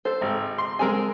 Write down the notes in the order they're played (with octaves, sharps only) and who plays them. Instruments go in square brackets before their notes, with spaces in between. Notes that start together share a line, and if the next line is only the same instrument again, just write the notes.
[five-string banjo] A4 C5
[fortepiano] G#1
C6
[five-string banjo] G#3 C4 G#5 [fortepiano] G#4 A#4